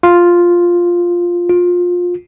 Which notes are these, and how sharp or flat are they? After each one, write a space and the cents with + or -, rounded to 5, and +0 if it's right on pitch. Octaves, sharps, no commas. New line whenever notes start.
F4 +0
F4 +20